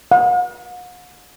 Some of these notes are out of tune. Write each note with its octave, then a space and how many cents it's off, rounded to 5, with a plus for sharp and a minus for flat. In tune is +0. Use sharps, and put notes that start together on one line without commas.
F#5 -45